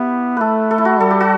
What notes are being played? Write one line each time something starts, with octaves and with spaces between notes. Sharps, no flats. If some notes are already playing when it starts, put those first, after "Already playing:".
Already playing: B3 E4 G4
A3 A4 B4
A4
E4
F#4
G3 A4
G4
F#4